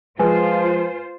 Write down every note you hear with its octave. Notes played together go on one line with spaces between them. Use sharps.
F3 G#3 F4 B4 C5 G#5